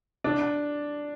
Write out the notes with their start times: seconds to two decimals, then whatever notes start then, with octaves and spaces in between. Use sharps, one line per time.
0.24 D4